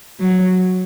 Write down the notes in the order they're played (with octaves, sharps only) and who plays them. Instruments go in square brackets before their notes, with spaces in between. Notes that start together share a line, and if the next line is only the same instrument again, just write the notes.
[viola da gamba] F#3